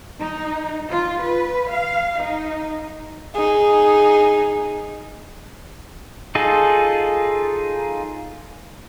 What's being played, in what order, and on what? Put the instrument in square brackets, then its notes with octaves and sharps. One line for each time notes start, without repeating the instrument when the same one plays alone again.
[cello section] D#4
F4
B4
F5
D#4
[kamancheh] D#4 G#4
[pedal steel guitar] D#4 F4 G#4 A4